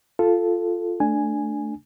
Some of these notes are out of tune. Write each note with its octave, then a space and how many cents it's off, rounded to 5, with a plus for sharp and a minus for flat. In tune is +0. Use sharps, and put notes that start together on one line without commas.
F4 +0 A4 +0
A3 +0 D4 +0 G#5 +0